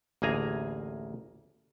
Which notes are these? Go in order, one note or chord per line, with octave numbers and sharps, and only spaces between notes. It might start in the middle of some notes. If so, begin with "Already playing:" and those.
A1 D2 A#3 G#4 G#5 A#5